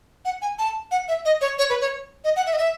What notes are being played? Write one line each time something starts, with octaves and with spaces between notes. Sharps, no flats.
F#5
G#5
A5
F#5
E5
D#5
C#5
C#5
B4
C#5
D#5
F#5
E5
D#5
E5